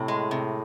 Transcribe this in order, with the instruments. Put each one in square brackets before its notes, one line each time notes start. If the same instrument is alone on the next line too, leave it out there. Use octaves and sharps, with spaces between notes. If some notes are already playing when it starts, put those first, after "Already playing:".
Already playing: [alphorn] A2 [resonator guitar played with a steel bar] C3
[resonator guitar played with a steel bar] G#3
C3